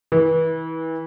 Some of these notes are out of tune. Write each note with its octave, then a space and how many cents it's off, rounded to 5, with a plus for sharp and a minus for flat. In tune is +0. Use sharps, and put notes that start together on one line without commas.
E3 -30